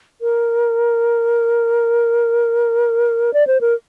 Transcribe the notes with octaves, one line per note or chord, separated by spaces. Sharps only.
A#4
D5
C5
A#4